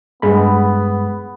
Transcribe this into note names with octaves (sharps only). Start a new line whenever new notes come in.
G2 G#3 B3 B5